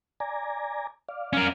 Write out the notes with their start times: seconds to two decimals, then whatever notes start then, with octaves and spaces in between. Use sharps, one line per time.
0.20 D5 G#5 A#5
1.09 D5 F5
1.33 C#4 A#4